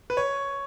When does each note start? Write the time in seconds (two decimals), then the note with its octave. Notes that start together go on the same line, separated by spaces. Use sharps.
0.10 B4
0.17 C#5